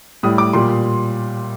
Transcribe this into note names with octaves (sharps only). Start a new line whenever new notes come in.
A2 G3 D#6
D6
A#2 G3 C6